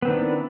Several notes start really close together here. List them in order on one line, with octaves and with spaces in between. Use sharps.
B3 C4 D#3 D4 E4